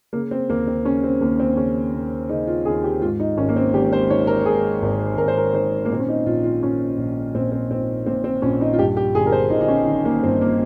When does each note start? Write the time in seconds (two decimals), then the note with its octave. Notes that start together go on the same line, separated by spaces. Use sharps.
0.13 C#3 A#3
0.31 C4
0.49 D#2 A#3
0.67 C4
0.85 C#3 C#4
1.03 C4
1.21 D#2 A#3
1.39 C4
1.57 C#3 C#4
1.94 D#2
2.29 C#3 D#4
2.47 F4
2.65 D#2 G#4
2.84 G4
3.02 G#2 F4
3.20 D#4
3.37 G#1 C#4
3.49 A#3
3.56 C4
3.73 G#1 G4
3.92 C5
4.10 D#3 C#5
4.27 A#4
4.46 G#2 G#4
4.82 G#1
5.18 G#1 A#4
5.28 C5
5.37 A#4
5.54 D#3 C5
5.85 A#3
5.90 A#2 C4
6.00 C#4
6.09 D#4
6.26 A#1 F4
6.44 F4
6.62 A#2 C#4
6.98 A#1
7.34 A#2 C4
7.52 C4
7.70 A#1 C4
8.06 A#2 C4
8.24 C4
8.42 A#1 C#4
8.61 D#4
8.73 F4
8.78 G2 G4
8.97 G4
9.15 G1 G#4
9.26 A#4
9.32 C5
9.50 G1 D#4
9.61 D#4
9.68 C#4
9.87 D#3
10.05 A#3
10.23 G2 C4
10.41 A#3